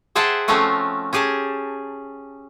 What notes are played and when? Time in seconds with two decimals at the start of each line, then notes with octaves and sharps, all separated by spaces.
0.15 G#4 C5 E5 F#5 G5 A5
0.48 F3 A3 C4 C#4 F4 F#4
1.13 C#4 G4 G#4 G#5 A5